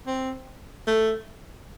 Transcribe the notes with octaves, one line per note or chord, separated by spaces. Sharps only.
C4
A3